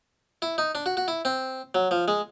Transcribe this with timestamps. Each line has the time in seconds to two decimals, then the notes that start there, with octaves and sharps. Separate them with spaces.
0.42 E4
0.58 D#4
0.75 D4
0.86 F#4
0.97 F#4
1.08 E4
1.25 C4
1.75 F#3
1.91 F3
2.08 G#3